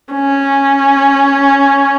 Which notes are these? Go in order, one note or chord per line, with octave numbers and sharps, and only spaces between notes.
C#4